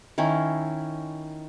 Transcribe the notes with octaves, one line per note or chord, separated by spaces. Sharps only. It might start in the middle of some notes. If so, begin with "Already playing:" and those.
D#3 C#4 E4